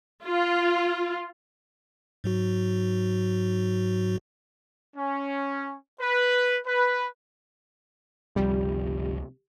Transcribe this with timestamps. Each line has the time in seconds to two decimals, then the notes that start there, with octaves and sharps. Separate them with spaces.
0.24 F4
2.24 G#2 F#3 F#4
4.96 C#4
6.01 B4
6.67 B4
8.36 G1 C#2 C3 F3 G3 G4